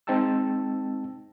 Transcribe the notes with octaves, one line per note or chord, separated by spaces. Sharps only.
G#3 C4 D#4 G5 A5 E6